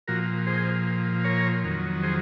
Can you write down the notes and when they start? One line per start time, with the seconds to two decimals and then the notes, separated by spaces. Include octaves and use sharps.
0.08 A#2 F3 F#4 A#4
0.47 G#4 C5
1.24 A#4 C#5
1.64 F2 D#3 F#3
2.03 G#4 C5